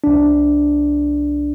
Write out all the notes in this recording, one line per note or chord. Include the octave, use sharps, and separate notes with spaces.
C2 D4